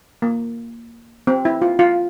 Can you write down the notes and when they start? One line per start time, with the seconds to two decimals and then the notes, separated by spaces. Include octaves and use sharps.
0.22 A#3
1.27 C4
1.45 E4
1.62 F4
1.79 F4